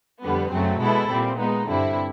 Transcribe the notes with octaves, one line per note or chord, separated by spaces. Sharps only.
F2 D3 G3 B3
F#2 C#3 F#3 A3 C4
B2 G#3 B3 E4 A4
A#2 G3 C4
G#3 B3 D#4
G2 D3 G3 C4 E4